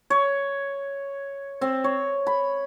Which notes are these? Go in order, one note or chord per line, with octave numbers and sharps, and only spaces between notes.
C#5
C4
C#5
B5